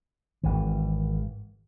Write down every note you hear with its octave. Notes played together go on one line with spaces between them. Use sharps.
G#1 E3